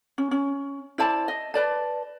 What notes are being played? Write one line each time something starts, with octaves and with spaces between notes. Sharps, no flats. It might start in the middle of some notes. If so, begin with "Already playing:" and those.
C#4
C#4
E4 C5 D5 A5
D#5
B4 D5 A5